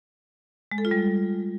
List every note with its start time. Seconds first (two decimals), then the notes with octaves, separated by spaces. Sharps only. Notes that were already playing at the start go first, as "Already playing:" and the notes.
0.71 G#3
0.78 A4
0.85 F4
0.91 G3